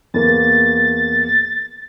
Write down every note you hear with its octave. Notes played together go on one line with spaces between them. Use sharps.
E2 A#3 A6